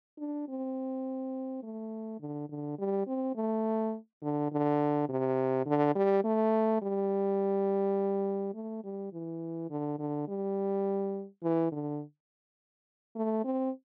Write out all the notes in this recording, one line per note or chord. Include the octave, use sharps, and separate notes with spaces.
D4
C4
A3
D3
D3
G3
C4
A3
D3
D3
C3
D3
G3
A3
G3
A3
G3
E3
D3
D3
G3
E3
D3
A3
C4